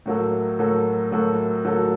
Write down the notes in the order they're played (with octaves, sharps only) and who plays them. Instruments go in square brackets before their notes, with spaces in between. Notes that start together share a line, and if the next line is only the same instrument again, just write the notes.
[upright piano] A2 F#3 A#3 F#4 A4
A2 F#3 A#3 F#4 A4
A2 F#3 A#3 F#4 A4
A2 F#3 A#3 F#4 A4